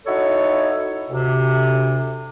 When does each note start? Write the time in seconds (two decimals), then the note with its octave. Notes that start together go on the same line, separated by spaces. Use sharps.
0.06 D#4 E4 F#4 A4 C#5
1.10 D2 C3